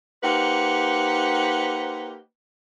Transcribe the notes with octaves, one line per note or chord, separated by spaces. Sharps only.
A#3 D#4 G4 B4 C5 F#5